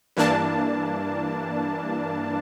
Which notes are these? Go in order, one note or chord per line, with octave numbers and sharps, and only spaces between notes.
G2 E3 A#3 D4 A5